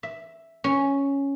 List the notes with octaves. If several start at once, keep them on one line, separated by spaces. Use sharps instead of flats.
E5
C#4